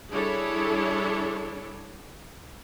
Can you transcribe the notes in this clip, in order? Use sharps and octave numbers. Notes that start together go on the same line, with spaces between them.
G3 D4 E4 G#4 A4 C#5